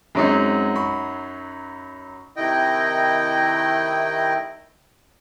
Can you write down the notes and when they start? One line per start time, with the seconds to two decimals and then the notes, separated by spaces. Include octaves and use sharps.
0.15 F#2 F#3 G#3 C4 D#4
0.76 B5 C#6
2.36 C3 D#3 A3 E4 D#5 G5